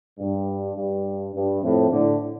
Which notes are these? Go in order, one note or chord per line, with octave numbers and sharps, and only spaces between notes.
G2
G2
G2
F2 A2
A2 D3